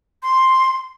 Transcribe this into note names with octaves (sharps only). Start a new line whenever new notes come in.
C6